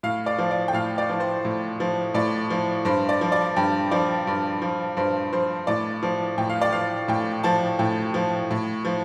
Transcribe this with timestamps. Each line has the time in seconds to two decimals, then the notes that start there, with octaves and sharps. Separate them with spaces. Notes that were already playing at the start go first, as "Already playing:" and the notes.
0.03 A2 F5
0.26 D5
0.38 F3
0.51 D5
0.68 G5
0.73 A2 F5
0.98 D5
1.09 F3
1.20 C5
1.45 A2
1.80 F3
2.14 A2 D5
2.50 F3
2.85 G2 C5
3.09 D5
3.21 F3
3.32 D5
3.56 G2 G5
3.91 F3 D5
4.27 G2
4.62 F3
4.97 G2 C5
5.33 F3 C5
5.67 A2 D5
6.03 F3
6.38 A2 G5
6.50 F5
6.62 D5
6.72 F3 F5
7.08 A2 G5
7.43 F3 A5
7.79 A2 G5
8.14 F3
8.51 A2
8.85 F3